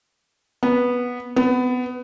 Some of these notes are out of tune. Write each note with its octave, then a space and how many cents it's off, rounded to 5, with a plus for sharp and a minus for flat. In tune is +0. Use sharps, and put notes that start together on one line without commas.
B3 -10
B3 +20